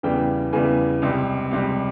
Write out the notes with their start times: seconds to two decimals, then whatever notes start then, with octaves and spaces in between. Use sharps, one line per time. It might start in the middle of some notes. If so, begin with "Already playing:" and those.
0.03 E2 C#3 E3 G3 G5
0.53 E2 C#3 E3 G3 G#5
1.02 C#2 C3 G3
1.51 C#2 C3 G3